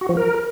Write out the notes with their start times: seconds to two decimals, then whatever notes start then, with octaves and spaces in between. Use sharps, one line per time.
0.01 F#4
0.09 F3
0.17 A#4